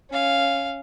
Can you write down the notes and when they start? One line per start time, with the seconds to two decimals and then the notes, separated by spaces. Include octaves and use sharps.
0.10 C#4 F5